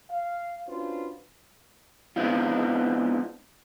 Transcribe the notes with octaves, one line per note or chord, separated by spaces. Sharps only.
F5
C#4 D4 F4 F#4 B4 C5
G#3 B3 C4 D4 E4 F4